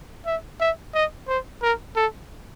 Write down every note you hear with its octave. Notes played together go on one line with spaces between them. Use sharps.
E5
E5
D#5
C5
A#4
A4